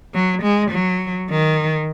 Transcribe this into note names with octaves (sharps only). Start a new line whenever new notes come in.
F#3
G#3
F#3
D#3